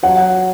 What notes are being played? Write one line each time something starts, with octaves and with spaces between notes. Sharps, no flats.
F#3 F#5